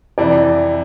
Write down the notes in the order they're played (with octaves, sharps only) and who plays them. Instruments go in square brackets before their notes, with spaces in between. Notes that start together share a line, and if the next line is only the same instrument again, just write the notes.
[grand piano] F2 C3 E3 [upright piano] D5